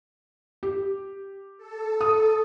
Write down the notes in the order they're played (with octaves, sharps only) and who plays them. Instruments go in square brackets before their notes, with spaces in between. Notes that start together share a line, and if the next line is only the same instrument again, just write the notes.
[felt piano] G4
[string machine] A4
[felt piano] D#6